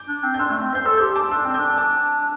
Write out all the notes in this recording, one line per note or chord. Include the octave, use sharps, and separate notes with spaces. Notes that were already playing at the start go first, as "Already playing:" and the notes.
Already playing: D6 G6
D4
C4
G6
D4 C6 E6
A3
C4
C5 G6
A4 C6 E6
G6
G4 C6 E6
A5 D6
D4 C6 E6
C4
D4 D6 G6
A5 D6